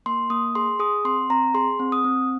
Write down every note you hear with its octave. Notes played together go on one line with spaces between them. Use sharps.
A#3 C6
A#3 D#6
G#4 C6
G#4 D#6
C4 C6
C4 A#5
G#4 C6
C4
D#6
C4